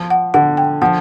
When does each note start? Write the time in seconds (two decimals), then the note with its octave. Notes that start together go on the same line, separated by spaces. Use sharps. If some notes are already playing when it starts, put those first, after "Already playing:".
Already playing: F3
0.10 F#5
0.34 D3 F#5
0.57 G5
0.82 F3 F#5